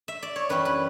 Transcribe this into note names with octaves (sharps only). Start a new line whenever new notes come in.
E5
D5
C#5
F#2 E3 G3 C#4 E4 B4
B4